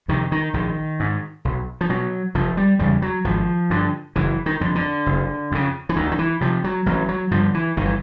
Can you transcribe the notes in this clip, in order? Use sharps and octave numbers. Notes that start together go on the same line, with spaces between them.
F2 C3 D#3
D#3
A#1 D#3
G#2
B1
F3
B2 F#3
F1 F3
G3
E2 C#3 G3
F#3
G#1 F3
G2 D3
F#1 E3
D#3
F2 D3
D3
F#1
F2 C#3
E3
D2 D#3
D#3
E3
C3 F3
F#3
A1 F#3
F#3
G2 D3 F3
E3
G1 D#3
E3